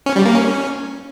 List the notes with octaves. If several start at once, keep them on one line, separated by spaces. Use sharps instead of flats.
C#4
G3
A#3
C#4